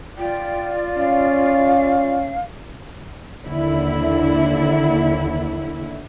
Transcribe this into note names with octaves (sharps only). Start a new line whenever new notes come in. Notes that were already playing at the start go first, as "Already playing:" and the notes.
F4 D5 G5
C#4 F5
D#2 D3 E4